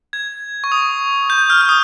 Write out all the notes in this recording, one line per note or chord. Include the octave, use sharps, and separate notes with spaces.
G#6
C#6
D#6
G6
F6
F6
D#6